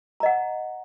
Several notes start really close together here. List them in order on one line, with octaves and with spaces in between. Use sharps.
A#5 D#5 F#5